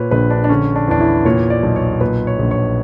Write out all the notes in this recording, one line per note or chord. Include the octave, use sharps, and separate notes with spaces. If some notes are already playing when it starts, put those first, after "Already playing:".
Already playing: A#2 B4 C#5
A#1 B4
D4
D4
D3 C#4
D4
E2 D4
E4
A#2 C#5
D5
B1
C#5
A#2 B4
C#5
A#1
C#5